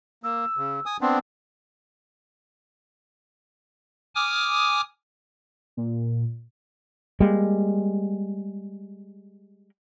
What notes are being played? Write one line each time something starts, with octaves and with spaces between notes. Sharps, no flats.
A#3 E6
C#3
G#5 D#6
B3 C4 D4 C6
G#5 D6 D#6 F6
A#2
G3 G#3 A#3